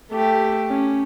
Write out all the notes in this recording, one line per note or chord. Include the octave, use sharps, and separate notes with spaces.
A3 G4
C#4